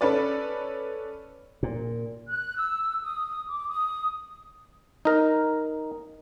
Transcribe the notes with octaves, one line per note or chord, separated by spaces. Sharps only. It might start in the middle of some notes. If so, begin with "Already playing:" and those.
C#4 A4 B4 D5
A#2
F#6
E6
D#6
D6
D#6
D#4 A#4